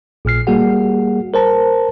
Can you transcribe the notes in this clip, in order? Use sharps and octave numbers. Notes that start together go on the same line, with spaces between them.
A#1 A#2 F6 C7
G3 A#3 F#4 G#4 F#5
A#4 C5 A5 A#5